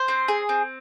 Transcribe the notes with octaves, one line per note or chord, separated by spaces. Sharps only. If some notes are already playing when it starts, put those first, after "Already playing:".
Already playing: C5
C4
G#4
C4